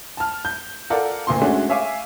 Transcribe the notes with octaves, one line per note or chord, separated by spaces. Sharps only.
A5 F6
G6
F4 A4 A#4 D5 F#5
D2 A#2 C6
G#3 A3 C#4 D4 F#4
C#5 E5 F5 G#5 D6